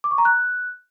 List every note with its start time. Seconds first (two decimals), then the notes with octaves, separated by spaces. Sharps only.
0.04 D6
0.11 C#6
0.18 A#5
0.25 F#6